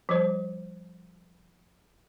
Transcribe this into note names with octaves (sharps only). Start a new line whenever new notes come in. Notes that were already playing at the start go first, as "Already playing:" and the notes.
F3 G3 C5